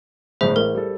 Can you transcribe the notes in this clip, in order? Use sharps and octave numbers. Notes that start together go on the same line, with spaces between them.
G1 A2 G#4 C5 E5
A1 A#4
G3 A4